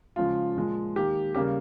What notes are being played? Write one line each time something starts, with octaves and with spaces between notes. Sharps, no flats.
C#3 F3 G#3 F4
A#2 F3 G#3
D#3 A#3 G4
C#3 G3 A#3 G4